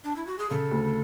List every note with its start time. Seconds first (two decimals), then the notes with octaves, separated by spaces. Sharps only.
0.04 D4
0.16 E4
0.27 F#4
0.39 G#4
0.50 C#3 A4
0.71 D2